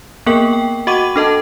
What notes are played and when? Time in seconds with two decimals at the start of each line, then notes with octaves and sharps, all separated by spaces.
0.26 A#3 B3 G#4 A#4 G5 F#7
0.53 G5
0.87 F#4 D#5 F#5 C#6 D6 D#7
1.16 D4 A4 D#5 A5